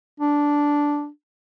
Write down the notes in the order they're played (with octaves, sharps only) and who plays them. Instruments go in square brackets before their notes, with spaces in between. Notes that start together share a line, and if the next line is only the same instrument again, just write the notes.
[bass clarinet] D4